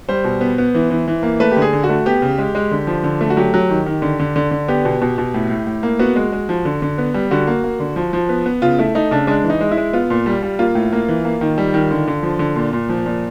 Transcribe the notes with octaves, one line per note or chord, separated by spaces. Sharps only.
G3 C5
B2
B3
B3
E3
E3
E3
A#3
A3 B4
G4
D3
G#4
D3
F#4
A3
B3 G4
C#3
G#3
G#3
D3
F3
D3
A3
F#4
F#3 G4
F#3
D#3
D#3
D3
D3
D3
D3
B3 G4
B2
B2
B2
A2
A2
A2
A#3
B3 F#4
G#3
G#3
F3
D3
D3
B3
G3
D3 F#4
A#3
A#3
D3
F3
F3
B3
B3
C#3 F4
A3 E4
A3 D#4
C#3 D4
G#3 D4
E3
D#4
G#3
E4
G#3
B3 F4
A#2
G3
G3
A#3 F4
A2
A#3
E3
A#3
D#3
G3
D#3
D3
D3
F3
D3
A#2
A#2
F3
A#2